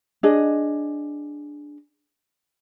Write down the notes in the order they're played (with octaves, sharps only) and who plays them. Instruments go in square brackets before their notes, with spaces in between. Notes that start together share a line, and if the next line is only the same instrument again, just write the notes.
[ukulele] D4 G#4 D#5